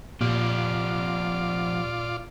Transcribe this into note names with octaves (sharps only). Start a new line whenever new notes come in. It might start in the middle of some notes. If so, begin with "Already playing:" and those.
A#2 F3 F4 G4 D5